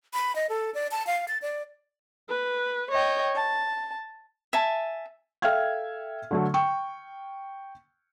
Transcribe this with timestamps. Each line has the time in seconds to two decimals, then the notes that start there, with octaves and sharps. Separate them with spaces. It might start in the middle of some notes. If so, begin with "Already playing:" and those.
0.13 B5
0.36 D#5
0.50 A4
0.74 D5
0.91 A5
1.07 F5
1.28 A6
1.42 D5
2.30 B4
2.92 C#5 D#5 G5
3.36 A5
4.53 E5 G#5 A5
5.42 A4 E5 F5 G5 F6 G#6
6.31 D3 F#3 A3
6.54 G5 C#6